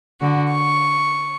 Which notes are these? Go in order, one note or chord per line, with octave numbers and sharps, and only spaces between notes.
D3 F#4
C#6